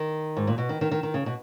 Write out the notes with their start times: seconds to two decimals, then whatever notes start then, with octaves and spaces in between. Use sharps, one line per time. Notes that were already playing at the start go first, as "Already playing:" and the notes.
Already playing: D#3
0.37 G#2
0.47 A#2
0.58 B2
0.69 D#3
0.81 D#3
0.91 D#3
1.03 D#3
1.14 C#3
1.26 B2